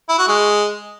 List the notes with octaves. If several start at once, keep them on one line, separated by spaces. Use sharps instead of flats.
E4
F#4
G#3